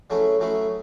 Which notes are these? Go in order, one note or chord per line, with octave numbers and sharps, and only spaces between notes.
F#3 A3 C#4 E4 G#4
F#3 A3 C#4 E4 G#4